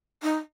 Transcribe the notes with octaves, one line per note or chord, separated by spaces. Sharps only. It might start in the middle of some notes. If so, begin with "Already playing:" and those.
D#4